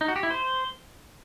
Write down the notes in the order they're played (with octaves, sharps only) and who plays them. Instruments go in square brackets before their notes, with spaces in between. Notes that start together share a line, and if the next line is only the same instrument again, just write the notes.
[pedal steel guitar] D#4
F#4
G4
E4
C5